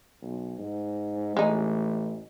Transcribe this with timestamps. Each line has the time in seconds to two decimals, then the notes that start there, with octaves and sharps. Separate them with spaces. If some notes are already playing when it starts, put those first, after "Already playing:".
0.22 B1
0.59 G#2
1.37 A1 G#3 D#4